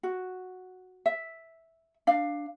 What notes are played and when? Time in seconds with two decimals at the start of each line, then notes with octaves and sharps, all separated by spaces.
0.03 F#4
1.06 E5
2.07 D4 F5